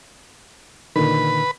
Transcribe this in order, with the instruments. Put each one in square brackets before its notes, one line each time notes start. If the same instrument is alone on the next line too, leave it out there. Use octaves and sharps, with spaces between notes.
[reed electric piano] A#2 D3 D#3 [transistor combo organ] B4